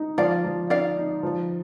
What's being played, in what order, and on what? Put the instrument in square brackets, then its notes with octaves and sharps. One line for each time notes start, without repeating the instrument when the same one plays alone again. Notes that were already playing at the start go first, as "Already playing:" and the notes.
Already playing: [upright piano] D#4
[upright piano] F3 [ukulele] D5 F5
[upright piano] F3
[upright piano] D#4 [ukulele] D5 F5
[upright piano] D#4
F3